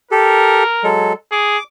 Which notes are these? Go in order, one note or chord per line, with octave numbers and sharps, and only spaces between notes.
G4 A4 A#4
F#3 G#3 A4
G#4 D6